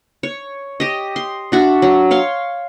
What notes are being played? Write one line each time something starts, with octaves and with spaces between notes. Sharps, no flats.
C#5
G4 D#5
C6
D4 F#4 E5
F#3
C#5 F5 C6